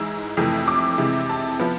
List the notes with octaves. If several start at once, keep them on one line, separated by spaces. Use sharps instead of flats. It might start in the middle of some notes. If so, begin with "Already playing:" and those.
Already playing: G#2 E3 G#3 E6
F2 C3 E3 A3
D6
C3 E3 G#3
A5
F3 B3